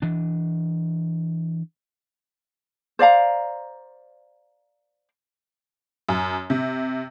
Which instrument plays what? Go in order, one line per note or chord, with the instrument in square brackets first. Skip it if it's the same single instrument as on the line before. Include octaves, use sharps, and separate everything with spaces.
[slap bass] E3 D4
[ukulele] C5 D5 F5 A#5
[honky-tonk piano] F#2
C3